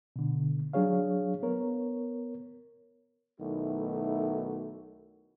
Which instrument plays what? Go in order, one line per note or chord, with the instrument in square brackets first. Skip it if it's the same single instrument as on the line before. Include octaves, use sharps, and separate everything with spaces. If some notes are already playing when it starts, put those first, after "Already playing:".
[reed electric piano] B2 D3
F#3 D4 G#4 C#5 F5
B3 A#4 C#5
[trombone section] B1 D#3 A3 E4 F#4